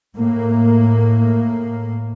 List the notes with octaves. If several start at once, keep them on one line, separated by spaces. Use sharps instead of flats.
A2 A#3